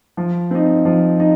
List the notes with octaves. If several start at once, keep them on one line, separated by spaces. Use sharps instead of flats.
F3
C4 D#4
F3
D#4